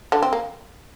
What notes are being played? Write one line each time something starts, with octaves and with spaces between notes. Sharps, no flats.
D3 D4
C4
A#3